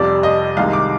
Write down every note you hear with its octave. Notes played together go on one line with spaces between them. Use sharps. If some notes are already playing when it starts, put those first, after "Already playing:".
Already playing: F1 F2 C3 G3 D5
D#5
C2 C3 D#3 G#3 F5
D6